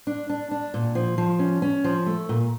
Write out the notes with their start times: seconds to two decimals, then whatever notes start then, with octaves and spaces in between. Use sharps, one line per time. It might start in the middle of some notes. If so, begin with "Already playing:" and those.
0.07 D4
0.30 D4
0.51 D4
0.74 A#2
0.95 F3
1.18 F3
1.39 C#4
1.62 C#4
1.84 F3
2.06 A3
2.29 A#2